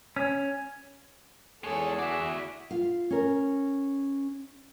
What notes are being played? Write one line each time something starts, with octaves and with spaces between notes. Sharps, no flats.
C#4
E2 G#3 G#4 A4 C#5
E4 F#4 D5 E5
F4 F5
C#4 A#4